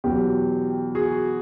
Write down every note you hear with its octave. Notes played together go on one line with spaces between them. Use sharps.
E2 B2 F#3 G4
F#4 G#4